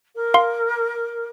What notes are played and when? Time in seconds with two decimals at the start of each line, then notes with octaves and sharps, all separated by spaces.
0.15 A#4
0.34 F5 C6